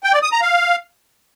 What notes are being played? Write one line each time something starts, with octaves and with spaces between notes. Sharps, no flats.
G5
D5
D#6
A#5
F5